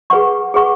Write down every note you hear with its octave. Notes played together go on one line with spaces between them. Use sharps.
G#4 B4 F#5 C#6
G#4 B4 F#5 C#6